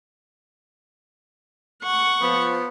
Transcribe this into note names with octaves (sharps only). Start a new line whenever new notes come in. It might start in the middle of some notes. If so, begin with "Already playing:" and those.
F#5 C#6
F3 B3